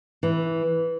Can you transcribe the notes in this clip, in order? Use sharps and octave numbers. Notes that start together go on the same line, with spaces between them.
E3